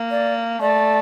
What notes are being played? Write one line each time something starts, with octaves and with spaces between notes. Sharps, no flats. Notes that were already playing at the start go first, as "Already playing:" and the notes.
Already playing: A#3
D5
A3 D5